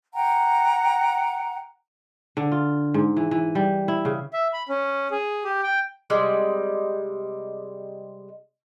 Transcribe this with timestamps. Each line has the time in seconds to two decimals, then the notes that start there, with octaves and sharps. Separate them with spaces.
0.14 F#5 G5 A#5
2.37 D3
2.52 F4
2.94 G#2
3.17 E3
3.31 E3
3.55 G3
3.88 E4
4.05 C#3
4.33 E5
4.53 B5
4.69 C#4
5.11 G#4
5.44 G4
5.63 G5
6.10 C3 G3 G#3